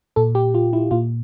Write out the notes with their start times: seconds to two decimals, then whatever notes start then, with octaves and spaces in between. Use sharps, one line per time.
0.16 A#2 A4
0.35 G4
0.54 F4
0.73 E4
0.91 A#2 F4